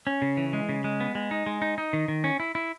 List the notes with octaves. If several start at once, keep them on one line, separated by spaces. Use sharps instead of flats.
C#4
C#3
E3
G#3
C#3
G#3
B3
G#3
D#4
G#3
D#4
D#4
D#3
D#3
C#4
E4
E4